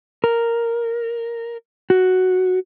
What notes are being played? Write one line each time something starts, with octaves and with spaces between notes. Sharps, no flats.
A#4
F#4